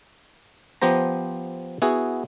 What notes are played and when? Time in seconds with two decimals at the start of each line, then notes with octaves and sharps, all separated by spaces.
0.82 F3 B3 G4 C5 A#5
1.82 B3 E4 F#4 G#4